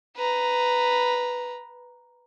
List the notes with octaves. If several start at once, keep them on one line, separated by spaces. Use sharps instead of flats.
B4 A#5